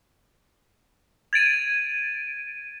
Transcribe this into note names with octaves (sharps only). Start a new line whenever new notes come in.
G#6 A6 D7 D#7